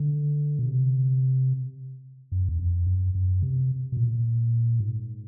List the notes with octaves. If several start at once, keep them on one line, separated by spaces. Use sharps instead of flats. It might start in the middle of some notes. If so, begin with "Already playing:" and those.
Already playing: D3
B2
C3
F#2
E2
F2
F#2
F#2
C3
B2
A#2
G#2